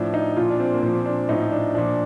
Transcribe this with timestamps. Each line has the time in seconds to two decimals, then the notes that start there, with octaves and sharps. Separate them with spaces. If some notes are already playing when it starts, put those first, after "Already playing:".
Already playing: A2 F3 D4
0.14 D#4
0.36 A#2 F3 F4
0.50 D4
0.60 C4
0.74 A#3
0.83 A#2 F3 C4
0.95 C4
1.06 D4
1.29 A2 F3 D#4
1.51 D4
1.75 A#2 F3 D4